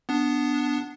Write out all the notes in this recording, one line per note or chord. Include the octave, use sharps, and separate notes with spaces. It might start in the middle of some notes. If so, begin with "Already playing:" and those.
B3 D4